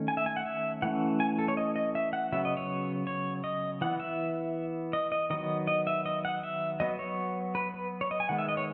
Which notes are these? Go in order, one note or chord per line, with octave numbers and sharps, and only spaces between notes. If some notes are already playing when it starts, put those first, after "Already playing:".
Already playing: D#3 A3 C#4
G#5
E5
G#5
F#5
E5
E3 A3 C#4 F#5
G#5
A4
C#5
D#5
D#5
E5
F#5
C#3 F#3 B3 E5
D#5
C#5
C#5
D#5
E3 B3 F#5
E5
D#5
D#5
D#3 F#3 B3 D#5
D#5
E5
D#5
F#5
E5
F#3 B3 D#5
C#5
B4
B4
C#5
D#5
G#5
D#3 G#3 B3 F#5
E5
D#5
C#5